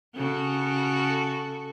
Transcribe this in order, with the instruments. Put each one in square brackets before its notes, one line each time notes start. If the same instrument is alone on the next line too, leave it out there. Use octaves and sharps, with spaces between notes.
[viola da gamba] C#3 F#4 A4